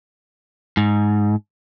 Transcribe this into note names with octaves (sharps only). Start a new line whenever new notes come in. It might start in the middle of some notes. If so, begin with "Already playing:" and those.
G#2